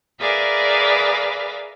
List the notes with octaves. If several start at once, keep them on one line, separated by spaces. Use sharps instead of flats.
G#4 A#4 B4 D5 E5 F5